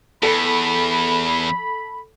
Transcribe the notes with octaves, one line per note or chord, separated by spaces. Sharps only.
E2 A4 B5